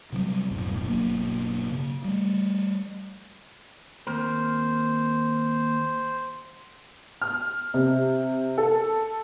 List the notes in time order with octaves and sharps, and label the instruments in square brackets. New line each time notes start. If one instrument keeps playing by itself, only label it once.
[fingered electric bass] C3 F#3 G3
D1 F#2 B2
G1 B2 F#3 A#3
C#3
G3 A3
[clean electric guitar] D#2 C4 A#4 [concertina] C5
[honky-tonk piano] F6
C3
A4